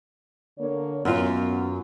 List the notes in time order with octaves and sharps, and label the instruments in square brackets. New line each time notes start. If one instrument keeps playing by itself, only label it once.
[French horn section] D3 A#3 C#5
[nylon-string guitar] F#2 F4 [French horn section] D#3 B3 C#4